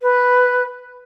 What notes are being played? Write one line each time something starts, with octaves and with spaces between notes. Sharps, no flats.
B4